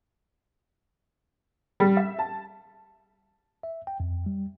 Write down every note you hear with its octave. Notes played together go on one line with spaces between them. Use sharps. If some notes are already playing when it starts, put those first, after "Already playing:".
G3
E5
A5
E5
G5
F2
G3